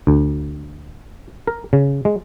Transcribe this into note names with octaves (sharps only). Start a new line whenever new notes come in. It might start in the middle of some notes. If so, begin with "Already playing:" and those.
D2
A#4
C#3
G#3